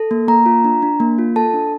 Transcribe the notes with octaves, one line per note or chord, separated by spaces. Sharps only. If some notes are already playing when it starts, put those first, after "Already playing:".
Already playing: A4
A#3
A#3 A#5
F4
D4
D4
A#3
F4
A4 A5
D4